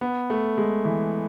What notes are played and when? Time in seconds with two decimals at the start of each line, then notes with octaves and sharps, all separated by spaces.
0.01 B3
0.30 A3
0.57 G#3
0.85 E3